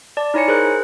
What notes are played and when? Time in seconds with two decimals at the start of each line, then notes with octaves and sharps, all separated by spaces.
0.17 D5 A5
0.34 D#4 E4 C#5 G#5 C#7
0.48 G#4 A#4 C5 F#6
0.65 G#4